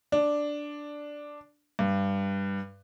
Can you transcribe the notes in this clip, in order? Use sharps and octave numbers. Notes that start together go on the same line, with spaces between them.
D4
G2